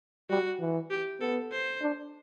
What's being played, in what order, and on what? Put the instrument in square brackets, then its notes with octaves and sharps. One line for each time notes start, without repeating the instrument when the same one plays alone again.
[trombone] G3 [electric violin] F#4
[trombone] E3
[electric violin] G4
[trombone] B3 [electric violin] A4
[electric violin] C5
[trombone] D4